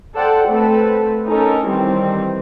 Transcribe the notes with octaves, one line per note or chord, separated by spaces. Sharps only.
A4 C5 D5 F#5 G5
A3 C4 A4 B4
C#4 D#4 A4 A#4
D#3 E3 G3 C4